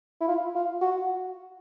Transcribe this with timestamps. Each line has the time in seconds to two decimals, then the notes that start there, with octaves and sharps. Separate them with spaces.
0.21 E4
0.28 F4
0.55 F4
0.82 F#4